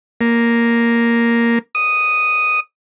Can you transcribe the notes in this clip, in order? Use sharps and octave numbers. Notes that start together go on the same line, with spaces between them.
A#3
D#6